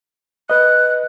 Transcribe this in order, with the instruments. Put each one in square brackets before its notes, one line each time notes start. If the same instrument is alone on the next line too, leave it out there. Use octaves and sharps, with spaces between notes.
[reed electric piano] B4 D#5 [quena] F#6